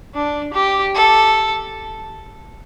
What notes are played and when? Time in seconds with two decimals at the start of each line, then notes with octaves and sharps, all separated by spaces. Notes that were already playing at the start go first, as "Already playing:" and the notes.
0.14 D4
0.54 G4
0.94 A4